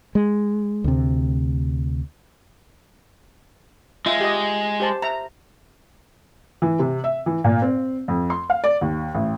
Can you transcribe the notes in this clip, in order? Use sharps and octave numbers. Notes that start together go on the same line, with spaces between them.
G#3
D2 C3
G#3 F4 E5
G4 D#5
G4 C5 A5
E5 A#5
E3
C3
E5
E3
A#2
C4
F2
C6
F5
D5
D#2
A1